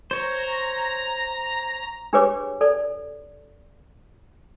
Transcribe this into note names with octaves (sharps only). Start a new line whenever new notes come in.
C5 C#5 A#5
D4 G4 G#4 B4 C#5 D6
A4 D5